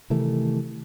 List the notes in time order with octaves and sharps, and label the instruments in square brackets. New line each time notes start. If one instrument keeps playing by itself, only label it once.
[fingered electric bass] C3 D#3 E3 A3